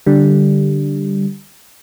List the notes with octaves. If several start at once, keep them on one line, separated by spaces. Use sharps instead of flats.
D3 G3